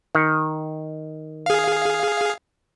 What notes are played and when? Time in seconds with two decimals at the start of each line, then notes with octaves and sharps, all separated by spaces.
0.15 D#3
1.46 G#4 F5